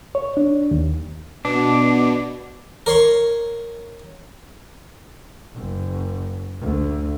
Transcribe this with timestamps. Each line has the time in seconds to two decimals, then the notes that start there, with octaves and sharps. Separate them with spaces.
0.15 C#5
0.37 D4
0.71 D#2
1.45 B2 D4
2.86 A#4 C#5 C6 C#6
5.55 F#1
6.60 D2